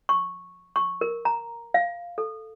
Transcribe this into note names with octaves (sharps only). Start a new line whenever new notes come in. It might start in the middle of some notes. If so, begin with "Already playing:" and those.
C#6
C#6
A#4
A#5
F5
A4